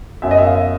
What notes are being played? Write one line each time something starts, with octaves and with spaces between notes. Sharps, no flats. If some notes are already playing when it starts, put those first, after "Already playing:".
F#2 E5
D#5
F#2 E5
F5
E5